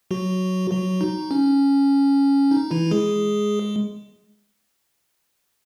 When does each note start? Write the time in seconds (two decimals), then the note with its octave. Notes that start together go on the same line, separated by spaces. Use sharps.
0.11 F#3 F#4
0.71 F#3 F#4
1.01 D#4
1.31 C#4
2.51 D#4
2.71 E3 E4
2.91 G#3 G#4